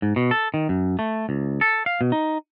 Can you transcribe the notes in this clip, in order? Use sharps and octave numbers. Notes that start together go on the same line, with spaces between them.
G#2
B2
A4
D#3
F#2
A3
C#2
A4
F5
B2
D#4